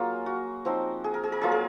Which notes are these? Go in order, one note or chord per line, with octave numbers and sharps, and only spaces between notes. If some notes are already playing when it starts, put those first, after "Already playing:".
Already playing: F#3 A#3 C#4 F4 G#4
F#4
F3 C4 D#4
G#4
A#4
G#4
A#4
F#3 A#3 F4 G#4
A#4